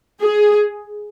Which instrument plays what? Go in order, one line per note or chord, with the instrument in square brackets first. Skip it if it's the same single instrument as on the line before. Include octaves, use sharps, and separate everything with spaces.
[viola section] G#4